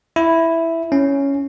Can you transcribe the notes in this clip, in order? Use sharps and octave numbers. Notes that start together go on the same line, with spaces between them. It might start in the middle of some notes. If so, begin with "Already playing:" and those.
E4
C#4